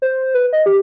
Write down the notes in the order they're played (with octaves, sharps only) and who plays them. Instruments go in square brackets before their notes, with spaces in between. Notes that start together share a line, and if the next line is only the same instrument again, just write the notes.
[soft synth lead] C5
B4
D#5
G4